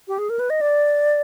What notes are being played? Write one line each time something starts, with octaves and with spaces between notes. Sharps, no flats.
G4
G#4
A#4
B4
D#5
D5